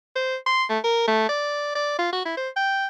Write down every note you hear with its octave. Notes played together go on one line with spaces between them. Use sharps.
C5
C6
A3
A#4
A3
D5
D5
F4
F#4
E4
C5
G5